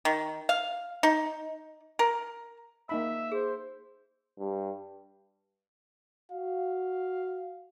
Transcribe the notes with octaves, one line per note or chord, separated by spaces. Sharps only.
D#3
F5
D#4
A#4
A#3 D#4 E5 B5
G#4 C5
G2
F#4 F5